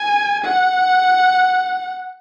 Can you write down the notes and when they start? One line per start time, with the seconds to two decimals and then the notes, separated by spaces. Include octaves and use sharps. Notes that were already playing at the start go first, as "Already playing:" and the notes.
Already playing: G#5
0.44 F#5